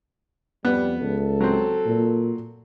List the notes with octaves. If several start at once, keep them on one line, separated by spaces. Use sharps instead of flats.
F2 G3 B3
C#2 A4
F#3 C4
A#2